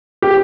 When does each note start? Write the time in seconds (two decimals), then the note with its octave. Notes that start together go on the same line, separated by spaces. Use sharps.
0.22 G4